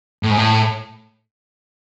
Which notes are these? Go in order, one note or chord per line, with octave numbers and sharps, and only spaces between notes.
A2
G#2
A2